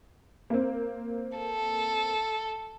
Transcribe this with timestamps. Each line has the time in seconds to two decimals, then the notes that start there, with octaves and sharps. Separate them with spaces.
0.50 A#3 C4
1.38 A4